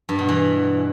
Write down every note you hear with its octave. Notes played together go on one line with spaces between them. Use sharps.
G2
B2
E3